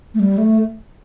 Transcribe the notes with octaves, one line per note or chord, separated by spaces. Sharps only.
A3
G3
A3